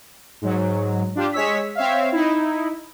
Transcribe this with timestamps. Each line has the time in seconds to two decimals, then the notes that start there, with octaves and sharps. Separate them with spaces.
0.42 G#2 F#3
1.15 D4 F4 G4
1.32 G#3 C#5 E6 B6
1.75 C4 C#5 E5 F5
2.12 D#4 E4